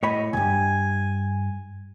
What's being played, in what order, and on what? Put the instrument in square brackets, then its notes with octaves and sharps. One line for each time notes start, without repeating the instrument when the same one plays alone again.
[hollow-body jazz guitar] A2 C#5 B5 [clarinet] D#5
[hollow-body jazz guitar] D2 G2 [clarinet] G#5